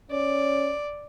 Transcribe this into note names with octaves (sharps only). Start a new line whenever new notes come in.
C#4 D5